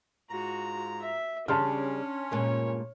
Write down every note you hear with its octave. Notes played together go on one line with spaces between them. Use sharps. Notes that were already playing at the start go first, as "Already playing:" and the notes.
G#2 F4 F#4 A#5
E5
C#3 G3 C#4 D4 A5 C6 F6
G2 A#2 G#3 C#5